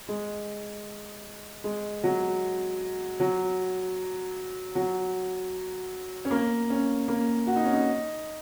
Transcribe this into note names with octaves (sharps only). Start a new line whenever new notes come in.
G#3
G#3
F#3
F#3
F#3
C#4
A#3
C#4
A#3
F#4
D#4
C#4
D#4